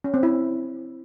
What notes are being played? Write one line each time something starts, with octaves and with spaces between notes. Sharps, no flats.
C#4
C4
E4